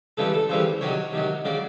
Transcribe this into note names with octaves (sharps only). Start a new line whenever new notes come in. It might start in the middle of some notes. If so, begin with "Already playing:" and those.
C#3 E3 G3 C4 A4
A4
C#3 E3 G3 C4 C5
C3 D#3 F#3 C#5
C3 D#3 F#3
C#3 F#3 D5